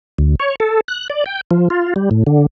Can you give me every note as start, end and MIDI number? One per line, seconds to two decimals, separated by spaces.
0.18 0.35 38
0.40 0.55 73
0.60 0.81 69
0.88 1.08 90
1.10 1.24 74
1.26 1.41 79
1.51 1.68 53
1.70 1.94 65
1.96 2.09 55
2.11 2.24 45
2.27 2.46 50